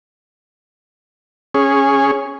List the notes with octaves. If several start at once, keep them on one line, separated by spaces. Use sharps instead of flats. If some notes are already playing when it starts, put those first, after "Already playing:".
C#4 G#4